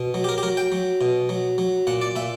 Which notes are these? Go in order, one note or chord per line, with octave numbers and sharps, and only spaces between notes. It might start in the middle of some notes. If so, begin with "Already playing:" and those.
Already playing: B2
F#3
G4
A#4
G4
F#3 A#4
G5
F#3
B2
F#3
F#3
A#2 F#5
D5
A#2 E5